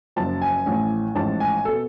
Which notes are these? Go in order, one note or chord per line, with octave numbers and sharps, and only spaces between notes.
F#1 F#2 F3 A5
G#5
A1 A2 F3
A1 G#2 F3 A5
G#5
B2 A4